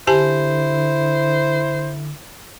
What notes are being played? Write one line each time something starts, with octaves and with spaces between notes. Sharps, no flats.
D3 E4 G4 C5 G#5 A5